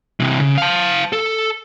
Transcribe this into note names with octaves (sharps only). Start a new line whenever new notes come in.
C3 E3
C#3
F5 A5
A4